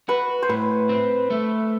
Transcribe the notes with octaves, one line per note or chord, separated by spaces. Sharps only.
F#4 B4
C5
A2 B4
C4
A3